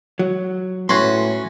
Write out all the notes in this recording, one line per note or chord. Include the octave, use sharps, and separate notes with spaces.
F#3
A2 C#4 F#4 B4 C6